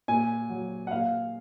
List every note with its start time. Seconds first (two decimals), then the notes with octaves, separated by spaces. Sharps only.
0.08 A#2 G#5
0.49 F#3
0.87 F#5
0.91 A#2 F5